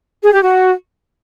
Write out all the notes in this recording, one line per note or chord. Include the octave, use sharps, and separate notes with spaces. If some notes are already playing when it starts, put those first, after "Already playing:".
G#4
G4
F#4